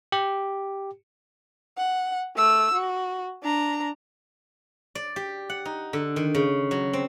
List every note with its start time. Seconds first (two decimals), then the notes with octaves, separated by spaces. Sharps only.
0.12 G4
1.77 F#5
2.36 A3 E6
2.74 F#4
3.43 D4 A#5
4.95 D5
5.16 G4
5.50 F#5
5.65 D#4
5.93 D3
6.16 D#3
6.35 C#3
6.71 F#3
6.93 C4